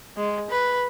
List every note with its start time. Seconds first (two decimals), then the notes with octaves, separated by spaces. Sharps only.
0.17 G#3
0.50 B4